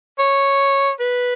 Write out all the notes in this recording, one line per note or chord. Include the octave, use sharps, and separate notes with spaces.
C#5
B4